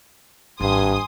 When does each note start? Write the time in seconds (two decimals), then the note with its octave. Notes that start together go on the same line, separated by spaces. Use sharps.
0.60 G#1 G2 G#5 C6 D#6